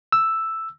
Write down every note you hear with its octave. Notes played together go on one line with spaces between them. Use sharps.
E6